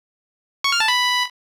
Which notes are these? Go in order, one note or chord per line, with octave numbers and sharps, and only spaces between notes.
C#6
F6
A5
B5